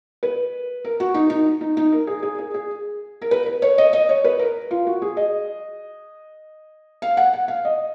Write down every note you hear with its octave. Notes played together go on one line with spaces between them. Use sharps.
B4
A#4
F#4
D#4
D#4
D#4
D#4
A#4
G#4
G#4
G#4
G#4
A#4
B4
B4
C#5
D#5
D#5
C#5
B4
A#4
F4
F#4
G#4
D#5
F5
F#5
F#5
F5
D#5